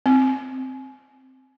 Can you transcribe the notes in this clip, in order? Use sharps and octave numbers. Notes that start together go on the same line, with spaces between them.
C4